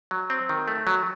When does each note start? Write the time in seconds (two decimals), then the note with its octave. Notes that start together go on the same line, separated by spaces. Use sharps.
0.11 F#3
0.30 C4
0.49 D#3
0.68 A3
0.87 F#3